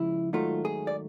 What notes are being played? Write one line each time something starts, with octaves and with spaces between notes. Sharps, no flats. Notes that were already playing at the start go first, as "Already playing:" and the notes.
Already playing: C#3 F3 G#3 C#4 E4
G#2 D#3 F#3 A3 F4
G#4
D5